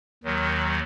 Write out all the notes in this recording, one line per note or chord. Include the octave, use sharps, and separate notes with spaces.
D#2 D#3 F#3